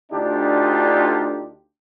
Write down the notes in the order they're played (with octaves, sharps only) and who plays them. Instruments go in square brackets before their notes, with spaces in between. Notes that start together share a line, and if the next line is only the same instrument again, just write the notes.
[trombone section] D2 D4 D#4 F4 G4